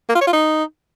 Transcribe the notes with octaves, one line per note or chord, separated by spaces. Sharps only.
A#3
F4
C#5
F4
D#4